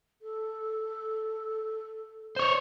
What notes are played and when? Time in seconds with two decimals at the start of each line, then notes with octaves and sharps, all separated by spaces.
0.22 A4
2.36 C5 C#5